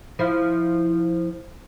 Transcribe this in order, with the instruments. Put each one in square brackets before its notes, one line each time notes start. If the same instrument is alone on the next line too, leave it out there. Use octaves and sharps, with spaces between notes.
[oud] F3 E4